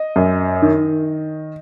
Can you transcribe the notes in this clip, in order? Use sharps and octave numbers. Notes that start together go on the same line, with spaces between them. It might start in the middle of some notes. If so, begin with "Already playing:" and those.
Already playing: D#5
F#2
D#3